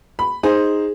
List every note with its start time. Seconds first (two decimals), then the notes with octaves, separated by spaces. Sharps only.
0.19 B5
0.43 D#4 G#4 C5